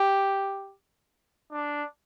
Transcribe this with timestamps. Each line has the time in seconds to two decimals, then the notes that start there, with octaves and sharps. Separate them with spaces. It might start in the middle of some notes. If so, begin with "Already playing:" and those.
Already playing: G4
1.52 D4